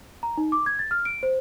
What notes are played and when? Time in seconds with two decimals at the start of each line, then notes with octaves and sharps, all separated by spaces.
0.23 A#5
0.38 D#4
0.52 D6
0.66 G#6
0.79 A6
0.91 F6
1.05 D7
1.23 C5